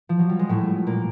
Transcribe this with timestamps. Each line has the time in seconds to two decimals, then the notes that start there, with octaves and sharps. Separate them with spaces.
0.09 F3
0.19 F#3
0.30 G3
0.39 G#3
0.49 A2 A3
0.87 A#2 A#3